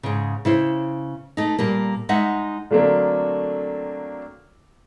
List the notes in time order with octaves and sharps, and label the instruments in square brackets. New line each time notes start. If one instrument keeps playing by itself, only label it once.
[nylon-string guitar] G#2 C#3
C#3 E4 C5
A3 D#4
A#2 G3 A#3
G#3 D#4 E5 F#5
[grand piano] D3 F#3 A3 A#3 C4 D4